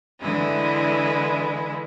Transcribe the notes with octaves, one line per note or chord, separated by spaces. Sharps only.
D3 E3 G#3 E4